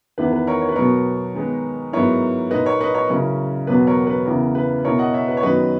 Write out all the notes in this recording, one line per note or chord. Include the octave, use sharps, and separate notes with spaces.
E2 D#3 A#3 E4 B4
B4
A#4 C#5
C#5
B4
B2 F#3 B3 A#4 C#5
D#3 G#3 B3 D#4
G#2 F#3 B3 E4 A#4 C#5
A#2 A#3 D#4 B4 D#5
A#4 C#5
B4 D#5
A#4 C#5
C#3 F#3 C#4 E4 A#4
E2 B2 F#3 A#3 B4
A#4 C#5
B4
E2 C#3 E3 A#4
B4
B2 A#3 E4 A#4 C#5
D#5 F#5
C#5 E5
B4
C#5
F#2 D#3 F#3 B3 B4 D#5